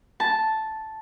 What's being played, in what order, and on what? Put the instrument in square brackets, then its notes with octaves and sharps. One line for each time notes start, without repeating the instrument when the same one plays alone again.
[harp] A5